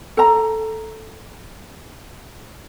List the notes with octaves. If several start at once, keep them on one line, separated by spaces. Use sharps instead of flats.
A4 A#5